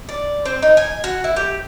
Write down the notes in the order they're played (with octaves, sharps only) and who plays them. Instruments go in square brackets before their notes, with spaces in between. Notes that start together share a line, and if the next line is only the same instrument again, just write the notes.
[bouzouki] D5
C4
D#4
G#5
F#4
E4
G4